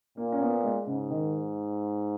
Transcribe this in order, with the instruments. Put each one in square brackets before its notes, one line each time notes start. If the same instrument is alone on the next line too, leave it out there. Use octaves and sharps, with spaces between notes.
[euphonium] A#2 [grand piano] A#3
[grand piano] C#4
B3
G#3
[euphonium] G#2 [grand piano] C#3
[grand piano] D#3